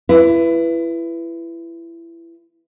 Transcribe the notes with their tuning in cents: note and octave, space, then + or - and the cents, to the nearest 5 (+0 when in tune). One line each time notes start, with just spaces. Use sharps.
E4 +25 B4 +0